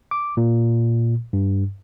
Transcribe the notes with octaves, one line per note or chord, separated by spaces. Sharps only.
D6
A#2
G2